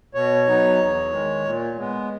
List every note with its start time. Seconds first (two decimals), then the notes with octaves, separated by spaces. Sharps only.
0.14 B2 C#5
0.47 F#3 B3 D#4
0.79 E2
1.11 D#3 G#3
1.44 A#2
1.77 G#3 B3